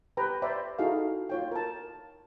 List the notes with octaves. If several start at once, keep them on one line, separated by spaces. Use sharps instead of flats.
G4 B4 G5 A#5
C5 D5 E5 G5 A#5 B5
D#4 E4 F#4 G#4 A4 F5
F4 C#5 G5
A#4 A5